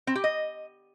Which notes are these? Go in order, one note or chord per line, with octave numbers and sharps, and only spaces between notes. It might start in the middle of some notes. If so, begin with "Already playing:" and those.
C4
G4
D#5